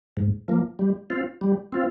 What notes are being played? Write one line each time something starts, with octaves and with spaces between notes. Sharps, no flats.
G#2
F3 A#3
G3
C4 F4
G3
C4 F4